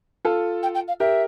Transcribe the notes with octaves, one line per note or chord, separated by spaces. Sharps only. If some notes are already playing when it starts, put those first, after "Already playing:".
F4 A4
G5
G5
F5
G4 A#4 E5